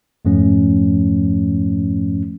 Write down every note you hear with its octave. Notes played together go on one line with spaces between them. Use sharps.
F2 G#2 F3 A3 C#4